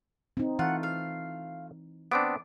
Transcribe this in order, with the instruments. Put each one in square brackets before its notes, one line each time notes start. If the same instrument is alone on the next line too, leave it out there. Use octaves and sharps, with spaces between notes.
[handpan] C4 D#4
[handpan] E3 [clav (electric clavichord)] A3 F4 [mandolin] F#5
[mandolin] F5
[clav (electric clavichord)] B3 C4 D4 [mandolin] D6